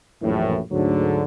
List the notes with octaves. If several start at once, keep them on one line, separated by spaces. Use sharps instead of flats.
A#1 F#2 A2 E3
D2 G#2 D3 F#3